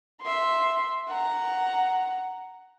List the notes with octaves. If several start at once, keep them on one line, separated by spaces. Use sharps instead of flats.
E5 C6
F#5 A#5